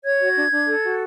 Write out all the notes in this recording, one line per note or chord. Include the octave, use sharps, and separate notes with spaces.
C#5 G#6
F#4
D4
D4
A4
F#4